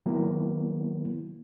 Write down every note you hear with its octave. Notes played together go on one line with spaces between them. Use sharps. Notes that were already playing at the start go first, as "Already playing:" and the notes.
D#3 F#3 A#3 B3 E4